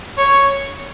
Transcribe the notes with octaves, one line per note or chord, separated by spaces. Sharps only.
C#5